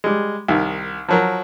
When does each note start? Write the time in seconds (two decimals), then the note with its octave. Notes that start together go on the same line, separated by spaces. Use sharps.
0.04 G3 G#3
0.48 C2 D#3
1.09 F3 F#3 A#4